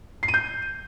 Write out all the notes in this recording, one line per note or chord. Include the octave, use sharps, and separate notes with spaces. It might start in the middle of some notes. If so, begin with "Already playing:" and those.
C7
D#7
G6